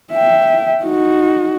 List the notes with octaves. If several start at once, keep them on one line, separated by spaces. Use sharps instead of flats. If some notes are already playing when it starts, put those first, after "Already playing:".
E5 G5
D#4 F#4